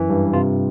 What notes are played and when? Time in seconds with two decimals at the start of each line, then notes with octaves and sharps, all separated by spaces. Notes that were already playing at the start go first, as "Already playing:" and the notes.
Already playing: F#2 E3
0.10 G2
0.33 C3 F4